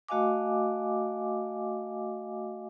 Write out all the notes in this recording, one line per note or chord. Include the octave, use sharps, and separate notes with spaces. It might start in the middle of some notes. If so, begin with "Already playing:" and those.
A3 F#4 D#5 F5 G#5 D6